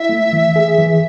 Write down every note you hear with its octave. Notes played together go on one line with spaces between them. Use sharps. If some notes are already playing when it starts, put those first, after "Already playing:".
Already playing: E4 E5
A3
E3
G#4
E3